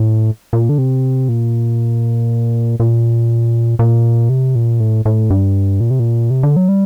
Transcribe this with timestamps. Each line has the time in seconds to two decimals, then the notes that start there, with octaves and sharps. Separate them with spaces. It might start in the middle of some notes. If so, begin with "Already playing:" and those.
Already playing: A2
0.53 A#2
0.69 D3
0.78 C3
1.29 A#2
2.80 A#2
3.79 A#2
4.29 C3
4.55 A#2
4.80 A2
5.05 A2
5.30 G2
5.80 A#2
5.91 C3
6.00 A#2
6.30 C3
6.43 D3
6.56 F#3
6.69 G3